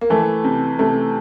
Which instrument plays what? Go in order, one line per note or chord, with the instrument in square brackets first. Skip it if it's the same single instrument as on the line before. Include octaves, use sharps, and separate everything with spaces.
[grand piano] A#3
[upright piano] E3 [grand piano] A3
[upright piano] C3
[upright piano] C3 [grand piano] A3